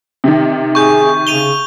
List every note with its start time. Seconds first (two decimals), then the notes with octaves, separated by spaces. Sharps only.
0.24 C3 D#3
0.75 G#4 C#6 G6
1.27 C#3 D#7 F7 G7